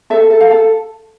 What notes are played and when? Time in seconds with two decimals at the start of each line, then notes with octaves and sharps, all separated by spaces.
0.10 A4 E5
0.30 A4
0.41 F5
0.51 A4